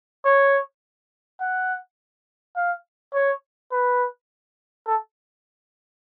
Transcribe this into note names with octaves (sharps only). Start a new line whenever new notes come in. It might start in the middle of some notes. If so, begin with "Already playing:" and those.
C#5
F#5
F5
C#5
B4
A4